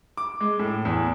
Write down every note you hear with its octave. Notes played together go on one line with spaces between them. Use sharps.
D6
G#3
A2
E2